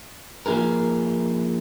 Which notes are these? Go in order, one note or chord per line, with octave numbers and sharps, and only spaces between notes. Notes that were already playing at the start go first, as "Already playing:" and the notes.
F3 A#3 D#4 G#4 A#4